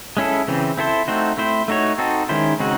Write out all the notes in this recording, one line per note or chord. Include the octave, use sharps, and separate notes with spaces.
G#3 C#4 E4 A4
C#3 E3 C4
C4 E4 A4 C5
A3 C4 D#4 F#4 C5
A3 C4 E4 C5
A3 D#4 F#4 C#5
C4 D#4 F#4 A4
D#3 G#3 C#4 E4 C5
C#3 G#3 C4 D#4 F#4